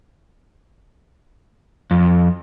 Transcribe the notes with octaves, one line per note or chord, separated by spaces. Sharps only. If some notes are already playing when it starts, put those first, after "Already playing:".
F2